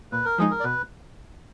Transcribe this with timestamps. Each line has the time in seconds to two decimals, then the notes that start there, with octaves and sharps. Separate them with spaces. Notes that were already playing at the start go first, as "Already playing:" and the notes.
0.12 A#2 B4
0.25 A#4
0.38 F3 G#3 D#4 G#4
0.51 A#4
0.60 D5
0.64 B2 B4